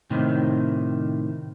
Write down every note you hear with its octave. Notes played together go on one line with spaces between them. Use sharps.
A2 C3 D#3